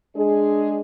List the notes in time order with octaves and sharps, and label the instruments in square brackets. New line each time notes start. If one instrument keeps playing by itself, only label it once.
[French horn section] G#3 D4 G#4